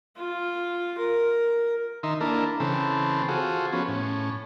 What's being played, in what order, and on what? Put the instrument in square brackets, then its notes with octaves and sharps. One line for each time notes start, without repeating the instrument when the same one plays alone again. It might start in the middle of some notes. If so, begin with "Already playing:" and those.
[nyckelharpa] F4
A#4
[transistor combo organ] D#3 D#4 E5 C6
A#3 D4 E4 A4 A#4
C#3 E3 C4 A4
F4 F#4 G#4 A4 C5
F3 B3 C#4 F#4
A2 C#4